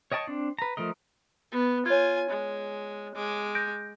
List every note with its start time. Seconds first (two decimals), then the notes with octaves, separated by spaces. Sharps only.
0.12 C#5 D#5 G5 A5 C#6
0.27 C4 D4
0.59 B4 A#5
0.77 F3 A3 A#4 D#5
1.52 B3
1.86 F4 C#5 G#5 G#6
2.30 G#3
3.15 G#3 D6
3.55 G6 A#6 D7